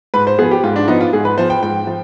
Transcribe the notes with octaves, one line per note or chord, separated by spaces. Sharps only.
G#2 B4
C5
F3 B3 G#4
G4
G#2 F4
D4
F3 B3 D#4
F4
G#2 G#4
B4
F3 B3 C5
G5
G#2 G5
F3